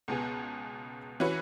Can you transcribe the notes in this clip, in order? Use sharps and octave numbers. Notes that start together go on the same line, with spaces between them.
C#2 B2 B3 G#4
E3 C#4 F#4 B4